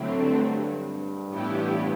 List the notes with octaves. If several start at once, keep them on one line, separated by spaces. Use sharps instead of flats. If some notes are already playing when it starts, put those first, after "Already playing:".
Already playing: A2 D3 F#3 A3 C4
G2
G2
A2 E3 B3 E4 G4